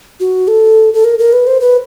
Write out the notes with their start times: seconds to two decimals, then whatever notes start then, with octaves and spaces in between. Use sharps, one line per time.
0.20 F#4
0.48 A4
0.94 A4
1.04 A#4
1.19 A#4
1.33 B4
1.47 C5
1.61 B4